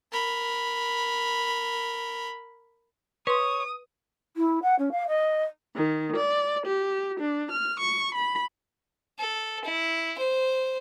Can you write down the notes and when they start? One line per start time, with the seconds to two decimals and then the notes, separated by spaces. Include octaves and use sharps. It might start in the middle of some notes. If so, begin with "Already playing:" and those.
0.12 A#4 B5
3.27 B4 C#5 C6 D#6
4.36 E4
4.62 F#5
4.78 C#4
4.92 F5
5.08 D#5
5.76 D#3
6.16 D5
6.66 G4
7.19 D4
7.51 F6
7.80 C#6
8.14 B5
9.19 A4
9.64 E4
10.18 C5